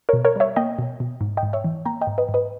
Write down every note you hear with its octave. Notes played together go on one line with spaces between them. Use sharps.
A#4 C#5
B2
A#4 C#5
G3 C#5 E5
A#3 D#5 G5
B2
B2
G#2
D#5 G5
G#2
C#5 E5
E3
A#3 G5 A#5
D#5 G5
G#2
B4 D#5
G#2
B4 D#5